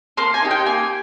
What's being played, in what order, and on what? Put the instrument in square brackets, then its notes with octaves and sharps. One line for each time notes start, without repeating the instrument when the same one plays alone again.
[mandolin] A#3 C6
G#5
D#4 G4
G5
A#3 G#5